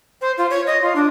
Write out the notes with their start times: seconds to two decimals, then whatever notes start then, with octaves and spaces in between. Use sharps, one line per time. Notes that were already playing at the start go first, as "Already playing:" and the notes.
0.21 C5
0.38 F4
0.50 C#5
0.67 D#5
0.82 F4
0.96 D4